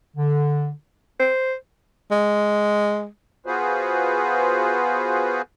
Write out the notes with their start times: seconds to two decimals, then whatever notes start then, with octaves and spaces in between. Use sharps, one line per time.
0.16 D3
1.20 C5
2.11 G#3
3.46 B3 F4 F#4 G#4 B4 C5